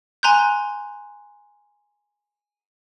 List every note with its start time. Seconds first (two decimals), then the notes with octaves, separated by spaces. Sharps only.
0.23 G#5 A#5 C6 F#6 G6